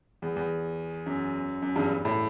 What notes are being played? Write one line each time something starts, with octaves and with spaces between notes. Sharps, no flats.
E2
E2
F#2
F#2
E2 G2
A2